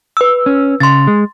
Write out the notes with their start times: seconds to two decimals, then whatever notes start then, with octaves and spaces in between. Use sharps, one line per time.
0.17 B4 E6
0.46 C#4
0.80 C#3 C6 A6
1.07 G#3